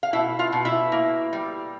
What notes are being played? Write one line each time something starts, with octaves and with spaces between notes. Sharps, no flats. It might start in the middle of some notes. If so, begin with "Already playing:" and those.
F5
B2 E4 E5
F4 F5
B2
E4 E5
A#3
G3